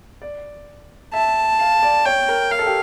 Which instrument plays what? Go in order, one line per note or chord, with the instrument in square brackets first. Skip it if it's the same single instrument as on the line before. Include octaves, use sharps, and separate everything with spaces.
[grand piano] D5
[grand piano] E5 [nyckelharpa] A5
[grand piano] F5
D5
[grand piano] C#5 [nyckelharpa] G5
[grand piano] A#4
[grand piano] A#4 [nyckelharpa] F5
[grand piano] A4
G4